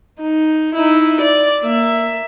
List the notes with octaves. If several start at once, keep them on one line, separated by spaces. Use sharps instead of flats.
D#4
D#4 E4
D5
A#3 E5